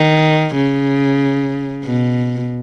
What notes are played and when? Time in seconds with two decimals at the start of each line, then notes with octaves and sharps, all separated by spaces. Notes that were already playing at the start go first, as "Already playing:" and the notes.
Already playing: D#3
0.55 C#3
1.84 B2